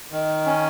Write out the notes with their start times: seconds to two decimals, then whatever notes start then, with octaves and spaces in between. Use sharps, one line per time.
0.12 D#3
0.46 C#4